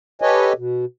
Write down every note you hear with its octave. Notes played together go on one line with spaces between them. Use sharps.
G4 A4 B4 C#5 D#5 G#5
B2